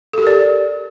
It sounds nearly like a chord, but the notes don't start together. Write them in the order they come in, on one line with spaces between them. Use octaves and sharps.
A4 G4 A#4 D5